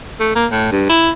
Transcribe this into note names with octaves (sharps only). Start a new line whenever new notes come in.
A3
A#3
A2
G2
E4